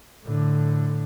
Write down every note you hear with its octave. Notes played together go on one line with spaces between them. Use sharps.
A2 D3